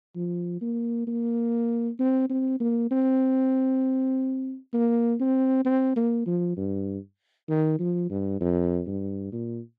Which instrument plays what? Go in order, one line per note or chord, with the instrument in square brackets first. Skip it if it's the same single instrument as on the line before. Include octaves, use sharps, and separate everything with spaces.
[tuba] F3
A#3
A#3
C4
C4
A#3
C4
A#3
C4
C4
A#3
F3
G2
D#3
F3
G2
F2
G2
A#2